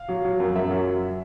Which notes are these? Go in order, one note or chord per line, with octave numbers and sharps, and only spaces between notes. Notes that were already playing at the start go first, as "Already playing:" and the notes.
Already playing: F5
F#3
F#3
F#2
F#2 E5
F#3